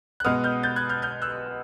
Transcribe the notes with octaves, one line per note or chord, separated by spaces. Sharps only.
F#6
B2 G#3 B3 D#6 F6
F6 G6
G6 A6
F#6 G#6
F6 G6
F6 G6
E6 F#6